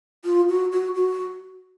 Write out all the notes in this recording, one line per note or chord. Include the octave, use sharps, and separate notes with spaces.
F4
F#4
F#4
F#4